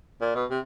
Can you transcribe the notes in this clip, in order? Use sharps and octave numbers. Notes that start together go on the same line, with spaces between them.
A#2
B2
C3